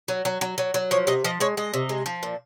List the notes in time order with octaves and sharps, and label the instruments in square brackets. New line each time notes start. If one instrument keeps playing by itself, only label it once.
[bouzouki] F#3
F#3
F#3
F#3
F#3
F3 C#5
C3 D#5
F3 D#5
G#3 C#5
G#3 D#5
C3
G#3
F3
A#2